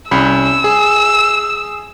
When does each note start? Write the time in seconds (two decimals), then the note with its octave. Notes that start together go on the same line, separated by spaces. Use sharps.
0.11 C2 C#4 B5 E6
0.64 G#4